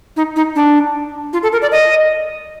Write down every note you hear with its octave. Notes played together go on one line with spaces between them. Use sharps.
D#4
D#4
D4
F4
A4
A#4
D5
D#5